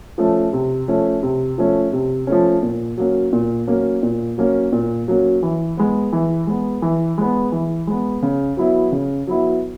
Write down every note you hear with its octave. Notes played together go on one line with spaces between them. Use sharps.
F3 A3 C#4
C3
F3 A3 C#4
C3
F3 A3 C#4
C3
F3 A3 C#4
A#2
F#3 A#3 C#4
A#2
F#3 A#3 C#4
A#2
F#3 A#3 C#4
A#2
F#3 A#3 C#4
E3
G#3 B3
E3
G#3 B3
E3
G#3 B3
E3
G#3 B3
C#3
F#3 B3 E4
C#3
F#3 B3 E4